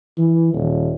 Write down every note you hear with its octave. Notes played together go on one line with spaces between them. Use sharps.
E3
D#1